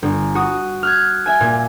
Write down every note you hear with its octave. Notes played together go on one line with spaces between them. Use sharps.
G1
F#4 D#6
F6 F#6 G#6
E5 G#5
A#2